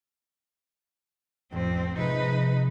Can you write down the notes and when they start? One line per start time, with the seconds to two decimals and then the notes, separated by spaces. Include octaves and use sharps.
1.52 A1 F2 C4
1.96 C3 F3 G#3 D#4 B4